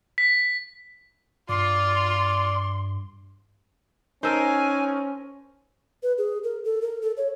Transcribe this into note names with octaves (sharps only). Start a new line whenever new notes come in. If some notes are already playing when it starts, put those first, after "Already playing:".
B6
G2 F4 D5 C6
C#4 D#4 A#4 C5 G#5 A5 E6 D7
B4
G#4
A#4
A4
A#4
A4
C#5